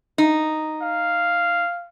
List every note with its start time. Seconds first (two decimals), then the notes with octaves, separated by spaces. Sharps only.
0.18 D#4
0.82 F5